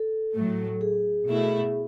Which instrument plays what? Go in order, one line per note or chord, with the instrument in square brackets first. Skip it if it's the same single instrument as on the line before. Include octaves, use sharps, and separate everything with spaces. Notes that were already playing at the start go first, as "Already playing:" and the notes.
Already playing: [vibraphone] A4
[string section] A2 F#3 A3
[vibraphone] G#4
[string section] B2 A3 E4